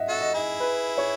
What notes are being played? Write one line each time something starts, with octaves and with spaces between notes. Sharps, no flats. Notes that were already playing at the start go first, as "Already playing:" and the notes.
Already playing: D#5 E5 F#5
F#4 A4
D#5
E4 G#4
B4
C#5